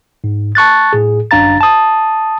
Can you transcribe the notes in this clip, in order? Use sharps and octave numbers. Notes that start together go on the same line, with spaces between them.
G#2
A5 C#6 F#6 A6
A2 G#4
G1 F#2 D4 F5 A#5 A6
A5 D#6